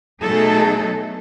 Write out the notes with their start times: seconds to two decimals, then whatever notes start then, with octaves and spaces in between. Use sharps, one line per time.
0.22 B2 F#3 A3 D#4 G#4 A4